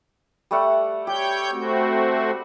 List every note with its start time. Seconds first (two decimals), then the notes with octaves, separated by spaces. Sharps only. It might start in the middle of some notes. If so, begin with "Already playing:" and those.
0.51 G3 A3 F#5
1.07 G4 C#5 G5 G6
1.52 A3 C4 F#4